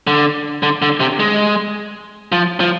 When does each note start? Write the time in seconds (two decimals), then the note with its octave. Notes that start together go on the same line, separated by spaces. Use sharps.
0.07 D3
0.63 D3
0.82 D3
1.00 C3
1.20 G#3
2.32 F3
2.60 F3